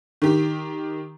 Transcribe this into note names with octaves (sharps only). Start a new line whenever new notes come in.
D#3 G4